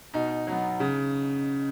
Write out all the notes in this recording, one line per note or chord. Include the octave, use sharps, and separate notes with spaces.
B2 D#4
F#3 B3
C#3